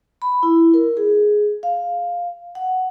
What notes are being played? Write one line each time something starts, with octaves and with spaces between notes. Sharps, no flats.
B5
E4
A#4
G#4
F5
F#5